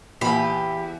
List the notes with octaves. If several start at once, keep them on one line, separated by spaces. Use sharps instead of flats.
E2 A#2 A#3 G4 F#5 B5